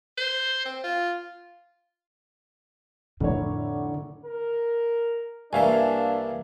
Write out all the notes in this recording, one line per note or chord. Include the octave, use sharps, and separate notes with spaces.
C5
C4
F4
F1 A2 D3 E4 C#5
A#4
C2 E3 A#3 D4 E5 F5 G#5